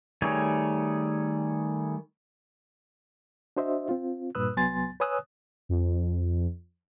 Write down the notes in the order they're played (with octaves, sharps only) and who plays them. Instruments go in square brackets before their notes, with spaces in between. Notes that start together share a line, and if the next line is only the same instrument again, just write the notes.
[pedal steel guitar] D#3 G3 A3 G#4 C#5
[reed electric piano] D4 F#4 C5 D#5 E5
C4 F4
G2 A#2 B4 D#6 E6 F#6
C2 F#3 B3 G#5 C6 A6
B4 C#5 G#5 D#6 E6 F#6
[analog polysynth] F2